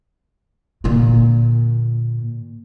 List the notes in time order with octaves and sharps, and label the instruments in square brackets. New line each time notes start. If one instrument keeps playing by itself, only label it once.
[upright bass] A#2 D3